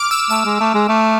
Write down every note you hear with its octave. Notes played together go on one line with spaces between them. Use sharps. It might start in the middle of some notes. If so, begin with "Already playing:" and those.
Already playing: D6 F6
E6
A3 E6
G#3
A3
G#3
A3